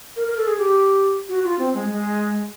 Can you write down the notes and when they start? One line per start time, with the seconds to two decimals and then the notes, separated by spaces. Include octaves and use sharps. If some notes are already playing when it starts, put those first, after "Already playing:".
0.16 A#4
0.28 A#4
0.37 A4
0.47 G#4
0.58 G4
1.29 F#4
1.44 F4
1.59 C4
1.74 G#3
1.89 G#3